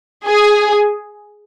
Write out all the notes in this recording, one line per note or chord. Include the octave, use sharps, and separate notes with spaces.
G#4